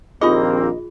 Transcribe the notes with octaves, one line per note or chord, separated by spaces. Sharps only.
A#1 D#2 A#3 C4 D#4 F4 G#4 D#5